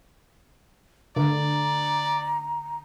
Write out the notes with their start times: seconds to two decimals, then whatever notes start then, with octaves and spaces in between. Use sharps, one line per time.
1.16 D3 D5 A#5